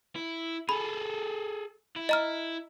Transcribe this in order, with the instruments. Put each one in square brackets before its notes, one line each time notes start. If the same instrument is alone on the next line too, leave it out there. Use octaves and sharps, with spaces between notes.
[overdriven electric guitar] E4
[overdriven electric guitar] G#4 A4 [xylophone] B5
[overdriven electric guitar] E4
[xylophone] D#5 A#5 F6